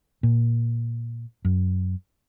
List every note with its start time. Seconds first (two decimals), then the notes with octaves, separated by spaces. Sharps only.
0.23 A#2
1.45 F#2